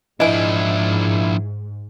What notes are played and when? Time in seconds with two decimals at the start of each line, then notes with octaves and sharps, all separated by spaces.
0.20 G#2 F3 D4 E4 D#5 G#5